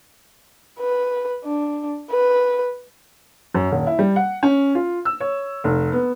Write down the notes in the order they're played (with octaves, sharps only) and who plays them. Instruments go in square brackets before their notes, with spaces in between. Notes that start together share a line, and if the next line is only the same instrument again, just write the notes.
[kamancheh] B4
D4
B4
[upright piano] F#2
D#1
E4
G3
F#5
C#4
F4
E6
C#5
F1
B3